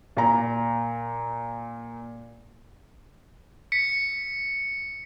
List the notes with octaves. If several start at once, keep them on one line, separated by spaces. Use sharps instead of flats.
A#2 A#5
B6 C#7